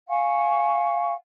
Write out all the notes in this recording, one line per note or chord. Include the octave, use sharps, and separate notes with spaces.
F5 F#5 G#5 C#6